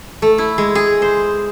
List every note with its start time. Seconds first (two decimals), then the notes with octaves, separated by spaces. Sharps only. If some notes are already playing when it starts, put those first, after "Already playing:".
0.22 A3
0.38 E4
0.58 G#3
0.75 G#4
1.02 C5